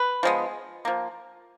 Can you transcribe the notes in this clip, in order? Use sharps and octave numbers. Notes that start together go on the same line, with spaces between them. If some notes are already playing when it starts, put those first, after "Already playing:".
Already playing: B4
F3 G#3 B3
F3 A#3